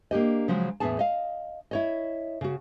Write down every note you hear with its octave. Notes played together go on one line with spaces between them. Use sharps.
A#3 D4 G4 D#5
C#3 F3 F#3 G#3
E2 A2 C3 B3 G#4 A5
D#5 F5
E4 C#5 D#5
C#3 F#4